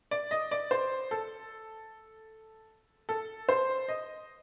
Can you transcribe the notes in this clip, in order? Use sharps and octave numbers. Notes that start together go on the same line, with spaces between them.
D5
D#5
D5
C5
A4
A4
C5
D#5